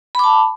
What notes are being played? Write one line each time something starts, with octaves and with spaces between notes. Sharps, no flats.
A5 B5 D6